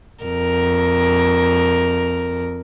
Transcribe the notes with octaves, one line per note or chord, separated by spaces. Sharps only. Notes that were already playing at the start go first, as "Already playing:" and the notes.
F2 A#4